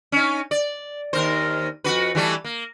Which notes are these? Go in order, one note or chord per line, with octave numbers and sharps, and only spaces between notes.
C#4 D#4
D5
D#2 A#4 C5
F2 F#4 B4
E3 G3 A3
A#3